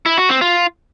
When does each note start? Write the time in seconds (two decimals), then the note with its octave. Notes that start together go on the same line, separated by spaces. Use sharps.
0.06 E4
0.18 F#4
0.29 C4
0.41 F4